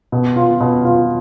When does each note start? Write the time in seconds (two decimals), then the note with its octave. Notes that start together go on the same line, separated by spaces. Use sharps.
0.12 B2
0.36 F4
0.60 B2
0.85 F4